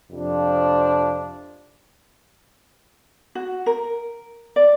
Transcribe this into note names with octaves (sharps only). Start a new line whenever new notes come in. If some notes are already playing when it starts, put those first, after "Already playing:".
F2 C3 F3 D4
F#4
A#4
D5